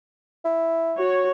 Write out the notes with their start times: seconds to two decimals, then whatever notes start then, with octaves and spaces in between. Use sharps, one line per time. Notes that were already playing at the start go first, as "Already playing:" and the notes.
0.44 E4
0.97 F#4 C#5